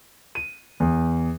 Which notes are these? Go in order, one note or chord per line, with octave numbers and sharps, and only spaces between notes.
D#7
E2